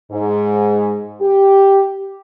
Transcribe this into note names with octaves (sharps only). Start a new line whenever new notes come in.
G#2
G4